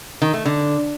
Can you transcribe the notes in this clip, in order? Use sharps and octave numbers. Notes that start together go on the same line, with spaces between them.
D#3
A3
D3